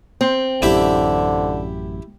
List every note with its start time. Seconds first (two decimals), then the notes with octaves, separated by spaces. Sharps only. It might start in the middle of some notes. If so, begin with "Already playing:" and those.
0.21 C4
0.62 A1 F#2 D3 E4 G4 E5